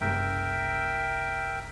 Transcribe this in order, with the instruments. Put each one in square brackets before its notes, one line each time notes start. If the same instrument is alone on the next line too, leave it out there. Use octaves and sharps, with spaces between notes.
[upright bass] F#1 C2 [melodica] A#4 E5 G5